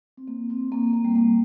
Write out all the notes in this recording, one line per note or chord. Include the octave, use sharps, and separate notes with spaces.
C4
A#3
C4
A#3
A#3
G3
A#3